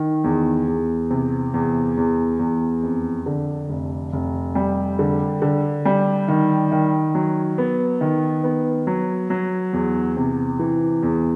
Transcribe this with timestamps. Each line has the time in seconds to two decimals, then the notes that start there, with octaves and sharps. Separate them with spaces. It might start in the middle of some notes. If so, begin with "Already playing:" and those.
Already playing: D#3
0.24 E2
0.68 E2
1.11 C3
1.54 E2
1.97 E2
2.39 E2
2.83 F2
3.26 D3
3.69 F1
4.13 F1
4.55 G3
4.99 D3
5.42 D3
5.85 G3
6.28 D#3
6.71 D#3
7.15 F#3
7.58 B3
8.01 D#3
8.44 B3
8.87 F#3
9.30 F#3
9.73 E2
10.17 C3
10.59 E3
11.02 E2